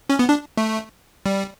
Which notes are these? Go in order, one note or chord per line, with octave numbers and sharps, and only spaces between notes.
C#4
B3
D4
A3
G3